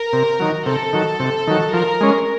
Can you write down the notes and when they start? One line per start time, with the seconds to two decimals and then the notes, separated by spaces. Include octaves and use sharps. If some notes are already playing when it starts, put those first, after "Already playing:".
Already playing: A#4
0.13 C3
0.40 D#3 F#3
0.66 C3 A4
0.93 D#3 F#3
1.20 C3
1.47 D#3 F#3
1.73 F3 A#4
2.01 G#3 C#4